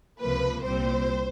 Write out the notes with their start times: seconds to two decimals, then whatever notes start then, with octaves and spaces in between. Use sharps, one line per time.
0.19 C#2 C3 F3 A#3 B4
0.63 C2 A#2 G3 C4 C5